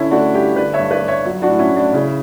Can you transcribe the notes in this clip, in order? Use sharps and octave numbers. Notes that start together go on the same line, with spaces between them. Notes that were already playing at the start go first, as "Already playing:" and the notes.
Already playing: D3 C#4 E4
A3 D4 F#4
G2 E4 G4
D3 B4 D5
C#5 E5
G2
B4 D5
G2
C#5 E5
F#3
D4 F#4
A2
C#4 E4
A2
D4
C#3 C#4 E4